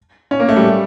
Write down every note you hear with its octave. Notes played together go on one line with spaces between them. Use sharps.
C#4
A#3
A3
G3